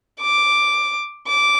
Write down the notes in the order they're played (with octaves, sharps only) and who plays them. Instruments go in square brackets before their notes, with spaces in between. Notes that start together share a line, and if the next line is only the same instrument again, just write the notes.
[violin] D6
D6